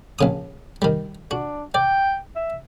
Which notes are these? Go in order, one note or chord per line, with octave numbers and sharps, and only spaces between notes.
A#1 C#3 D#6
D#3 G3
D4 F#4
D5 G5
E5